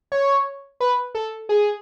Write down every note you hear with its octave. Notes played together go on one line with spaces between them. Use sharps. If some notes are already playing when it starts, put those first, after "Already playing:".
C#5
B4
A4
G#4